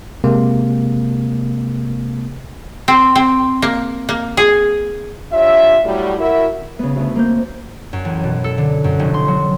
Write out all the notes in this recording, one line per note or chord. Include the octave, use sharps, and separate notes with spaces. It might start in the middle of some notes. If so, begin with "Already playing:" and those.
C3 G#3 A#3
C4
C4
A#3
A#3
G#4
D4 F4 G4 C#5 E5
A2 F#3 G3
E4 F#4 A#4 E5
C#3 B3
D2 B3
A#3 C4 G6
F#2
A1
B2
A4
D3
F#2
F1
C6
F#3